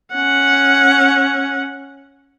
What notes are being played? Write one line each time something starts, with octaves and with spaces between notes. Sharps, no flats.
C#4 F#5